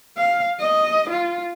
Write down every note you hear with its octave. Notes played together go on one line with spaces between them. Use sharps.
F5
D#5
F4